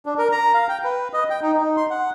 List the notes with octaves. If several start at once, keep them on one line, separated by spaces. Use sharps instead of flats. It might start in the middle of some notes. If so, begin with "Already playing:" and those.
D4
A#4
A#5
F5
G5
B4
D#5
G5
D#4
D#4
C6
F#5